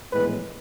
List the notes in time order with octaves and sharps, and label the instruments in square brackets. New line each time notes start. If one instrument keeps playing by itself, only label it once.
[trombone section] A#1 A2 E3 G#3 B3 B4